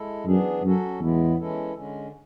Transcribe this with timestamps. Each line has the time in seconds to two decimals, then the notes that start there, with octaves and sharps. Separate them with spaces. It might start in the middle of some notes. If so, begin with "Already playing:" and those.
Already playing: G#3 E4 A4
0.26 F#2 E3 B3 D4 G#4
0.63 F#2 F#3 C#4 F#4 A4
1.00 E2 A2 G#3 B3 E4
1.37 E3 G#3 C#4 E4 A4
1.75 D3 G#3 C#4